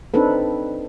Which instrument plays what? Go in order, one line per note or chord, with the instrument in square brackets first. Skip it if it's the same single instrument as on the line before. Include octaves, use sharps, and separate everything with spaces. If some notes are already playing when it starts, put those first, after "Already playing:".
[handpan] C4 D4 D#4 A4 B4